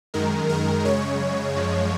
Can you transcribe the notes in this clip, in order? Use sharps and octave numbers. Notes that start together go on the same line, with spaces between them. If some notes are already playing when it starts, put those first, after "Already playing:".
F#2 D#3 G#3 A#4
A#4
F#2 C#3 G#3 C#5
F#2 F3 G#3